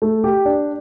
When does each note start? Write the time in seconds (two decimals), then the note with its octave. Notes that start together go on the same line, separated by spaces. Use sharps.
0.02 A3
0.24 G4
0.45 D4